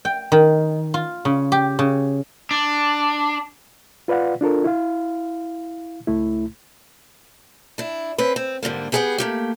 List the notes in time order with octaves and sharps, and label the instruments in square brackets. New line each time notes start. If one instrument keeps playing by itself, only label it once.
[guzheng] G5
D#3
F4
C#3
G4
C#3
[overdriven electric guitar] D4
[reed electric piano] F4 B4 D5 F5 F#5
D4 F4 A4 A#4
E4 F5
C#2 A3 E4
[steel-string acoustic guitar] D4 E4
C4 C#4 B4
C4
G#2 D3 G3 A#3
G3 B3 G#4 B4 F#5 G5
A3 A#3 G4